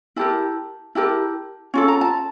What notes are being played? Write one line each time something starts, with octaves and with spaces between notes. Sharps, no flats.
E4 G4 A#4 A5
E4 G4 A#4 A5
C#4 F4 A4
A#5
A5